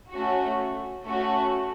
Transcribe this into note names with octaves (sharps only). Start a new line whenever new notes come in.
A3 C#4 F#4
A3 C#4 F#4